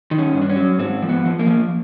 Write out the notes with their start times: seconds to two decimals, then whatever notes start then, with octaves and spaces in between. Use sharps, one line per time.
0.11 D#3
0.19 C#4
0.33 G2
0.42 D4
0.49 C#4
0.56 F#3
0.78 G#2 C4
1.02 F3
1.09 B3
1.25 F3
1.39 A#3
1.47 F3